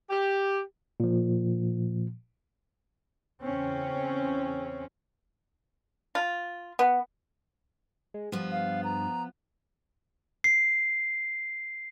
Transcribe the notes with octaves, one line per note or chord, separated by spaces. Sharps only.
G4
A#2 F3
E2 C#3 C4 C#4
F4
B3
G#3
G2 F3 B3
F5
A#5
C7